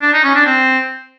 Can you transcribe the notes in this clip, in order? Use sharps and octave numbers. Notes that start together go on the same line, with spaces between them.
D4
D#4
C#4
D4
C4